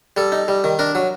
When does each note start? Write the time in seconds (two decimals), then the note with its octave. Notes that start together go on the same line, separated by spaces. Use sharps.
0.17 G3 A4
0.32 D#4
0.48 G3
0.64 D#3
0.79 D4 A#4
0.95 F#3